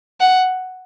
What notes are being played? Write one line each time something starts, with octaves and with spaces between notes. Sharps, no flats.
F#5